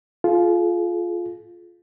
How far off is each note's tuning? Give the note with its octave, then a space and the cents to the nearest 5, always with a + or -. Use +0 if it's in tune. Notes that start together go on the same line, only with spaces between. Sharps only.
F4 +0 G#4 +45